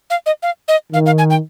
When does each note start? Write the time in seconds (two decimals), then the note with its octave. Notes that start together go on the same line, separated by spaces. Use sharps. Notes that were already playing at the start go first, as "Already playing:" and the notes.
0.10 F5
0.26 D#5
0.43 F5
0.68 D#5
0.93 D#3 F5
1.06 F5
1.18 G#5
1.30 G5